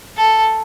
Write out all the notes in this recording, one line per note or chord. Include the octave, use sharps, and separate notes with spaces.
A4